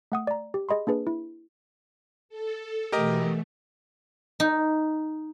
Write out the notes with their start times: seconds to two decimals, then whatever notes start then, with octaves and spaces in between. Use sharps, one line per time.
0.12 A3 F#5 D#6
0.27 D5 A#5
0.54 G4
0.69 G#4 D#5 B5 C6
0.87 A#3 D4 G#4 B4
1.07 E4
2.29 A4
2.92 B2 E3 A3 G4 A#4 D#5
4.40 D#4